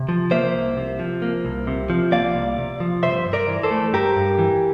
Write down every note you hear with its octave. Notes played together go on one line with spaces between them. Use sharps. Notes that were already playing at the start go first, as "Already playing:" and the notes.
Already playing: C3
F3
A#3 C5 E5
C2
C3
F3
A#3
C2
C3
F3
A#3 D5 F5
C2
C3
F3
G2 C5 E5
G2
A#4 D5
E3
A4 C5
A3
G2 G4 A#4
G2
E3